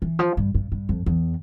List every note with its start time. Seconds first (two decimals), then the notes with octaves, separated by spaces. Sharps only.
0.02 E3
0.19 F3
0.37 G2
0.54 G2
0.72 G2
0.89 F2
1.06 E2